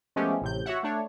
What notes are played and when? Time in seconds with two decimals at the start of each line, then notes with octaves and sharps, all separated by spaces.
0.16 F3 G#3 A3 B3 C#4 G4
0.42 A1 A2 C3 G6
0.66 F#4 C#5 E5 F#5
0.83 A3 D4 C#5